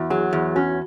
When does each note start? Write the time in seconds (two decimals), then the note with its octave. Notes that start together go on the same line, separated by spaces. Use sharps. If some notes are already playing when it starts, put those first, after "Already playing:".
Already playing: E2 E4 F#4
0.10 F#3 G#4
0.33 E2
0.56 C#4 F#4